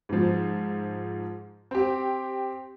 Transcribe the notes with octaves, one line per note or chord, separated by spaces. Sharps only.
G#2 F3
C4 G4